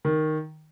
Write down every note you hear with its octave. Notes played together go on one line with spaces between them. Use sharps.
D#3